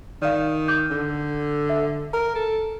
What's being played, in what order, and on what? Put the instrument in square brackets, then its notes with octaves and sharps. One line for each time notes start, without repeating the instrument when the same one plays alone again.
[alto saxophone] D#3 [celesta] D5 F5
[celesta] D6 G6
[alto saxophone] D3
[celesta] E5
[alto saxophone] A#4 [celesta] A#5
[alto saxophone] A4